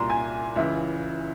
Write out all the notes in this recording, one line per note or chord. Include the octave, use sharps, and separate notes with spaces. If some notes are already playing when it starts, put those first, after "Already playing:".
Already playing: C2 A#2 G3 A#5 C6
G#5
C#2 C#3 E3 E5